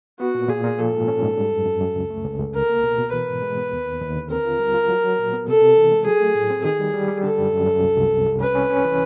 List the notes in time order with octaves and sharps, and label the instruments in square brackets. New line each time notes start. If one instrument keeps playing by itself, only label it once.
[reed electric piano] B3 [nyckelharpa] F#4
[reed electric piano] A#2
[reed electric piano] A#2 [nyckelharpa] G#4
[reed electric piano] A#2
[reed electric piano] F3 [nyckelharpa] A4
[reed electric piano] G#2
C#4
G#2
G3
F#2
F#2
F#2
C#2
A3
C#2
C#2
[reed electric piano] C2 [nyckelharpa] A#4
[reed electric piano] A#3
B2
B2
[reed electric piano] E3 [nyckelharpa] B4
[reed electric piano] G#2
G#3
B3
D#2
D#2
D#2
D3
[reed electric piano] C4 [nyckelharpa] A#4
[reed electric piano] F4
G3
F4
F#3
F#3
A#2
B3
[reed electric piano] C3 [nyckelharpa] A4
[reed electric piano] C3
E3
G#3
[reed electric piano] F#3 [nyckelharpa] G#4
[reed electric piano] A3
A2
C4
[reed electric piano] D#3 [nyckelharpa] G#4
[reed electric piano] G3
G3
G3
[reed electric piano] D3 [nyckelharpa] A4
[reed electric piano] F#2
F#2
F#2
C2
C2
C2
C2
[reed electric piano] C#4 [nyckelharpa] B4
[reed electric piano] C#4
C#4
E3